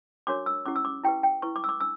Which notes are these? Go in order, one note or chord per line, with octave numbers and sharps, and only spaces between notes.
D4 F#4 A#4 C#5 D6
E6
C#4 E4 G4 D6
E6
D6
E4 G4 B4 G5
G5
E4 B4 C#6
D6
E6
D6
D4 E6